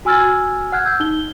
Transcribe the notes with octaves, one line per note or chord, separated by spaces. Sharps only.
F#4 G#5 E6 F6 G#6 A6
F#5 F6 F#6 G#6
E6 G6
D#4 G7